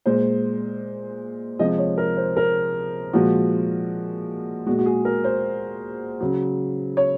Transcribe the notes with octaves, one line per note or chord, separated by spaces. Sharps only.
A#2 G#3 C5
C3 F3 G#3 D#5
C#5
A#4
C5
A#4
A#2 F3 G#3 F#4
A#2 G#3 F#4
F#4
G#4
A#4
C5
C#3 F#3
C#5